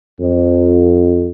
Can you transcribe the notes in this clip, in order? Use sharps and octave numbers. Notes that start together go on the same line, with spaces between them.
F2